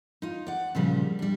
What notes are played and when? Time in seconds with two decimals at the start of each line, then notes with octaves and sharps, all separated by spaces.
0.22 D#4 F4
0.47 D5 F#5
0.75 A#2 C#3 F3 G3
1.19 G3 D4